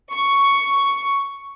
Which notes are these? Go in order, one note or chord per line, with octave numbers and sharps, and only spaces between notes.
C#6